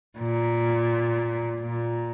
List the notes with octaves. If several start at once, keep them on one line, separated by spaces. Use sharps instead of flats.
A#2
A#2